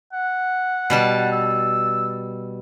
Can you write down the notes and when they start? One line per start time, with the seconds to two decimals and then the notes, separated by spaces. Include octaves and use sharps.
0.13 F#5
0.90 B2 G3 A5
1.32 E6